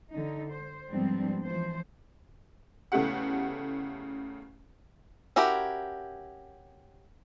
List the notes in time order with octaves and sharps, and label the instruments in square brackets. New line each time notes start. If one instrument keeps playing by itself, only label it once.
[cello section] D3 D#4
C5
G#2 F3 G3 B3 C4 D4
E3 F3 C5
[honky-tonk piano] E2 C#3 A3 G4 F#5
[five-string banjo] C#4 E4 F#4 G4 A#4